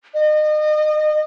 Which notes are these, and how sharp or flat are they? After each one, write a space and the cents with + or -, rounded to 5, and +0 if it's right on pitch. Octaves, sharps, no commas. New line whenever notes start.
D#5 -35